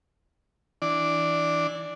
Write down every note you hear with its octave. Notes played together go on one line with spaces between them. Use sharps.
E3 D4 D5